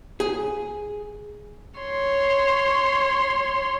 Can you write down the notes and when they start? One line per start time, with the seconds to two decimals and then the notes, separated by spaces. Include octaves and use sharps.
0.20 G#4
1.80 C#5 C6